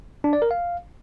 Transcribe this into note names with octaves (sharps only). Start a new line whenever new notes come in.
D4
D5
A#4
F5